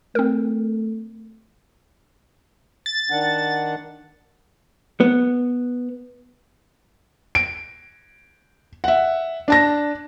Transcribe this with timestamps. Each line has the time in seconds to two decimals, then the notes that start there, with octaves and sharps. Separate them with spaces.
0.15 A3 C4 A#4
2.86 A6
3.11 D#3 D4 F#5
5.00 B3
7.35 D7
8.84 E5 F#5
9.48 D4 A5 A#6